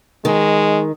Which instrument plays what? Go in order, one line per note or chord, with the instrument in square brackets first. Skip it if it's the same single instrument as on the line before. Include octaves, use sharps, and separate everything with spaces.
[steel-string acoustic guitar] D#3 [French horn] G#3